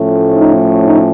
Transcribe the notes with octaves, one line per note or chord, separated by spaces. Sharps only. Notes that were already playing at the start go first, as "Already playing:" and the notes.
Already playing: A2 F3 A3 C#4
D#4
D#4